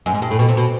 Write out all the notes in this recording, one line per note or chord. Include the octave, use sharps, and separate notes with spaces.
F#2
G#2
G2
A2
B2
C3
B2